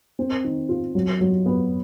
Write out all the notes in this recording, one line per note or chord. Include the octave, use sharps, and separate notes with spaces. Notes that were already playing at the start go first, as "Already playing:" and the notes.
C4
D#3
F4
F#3
F#3
B3